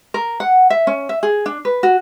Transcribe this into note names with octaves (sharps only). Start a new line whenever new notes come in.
A#4
F#5
E5
C#4
E5
G#4
D4
B4
F#4